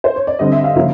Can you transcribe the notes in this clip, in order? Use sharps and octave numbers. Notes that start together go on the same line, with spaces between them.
C5
C#5
D5
D3 G3 C4 D#5
E5
F5
C#3 F3 A#3 C#4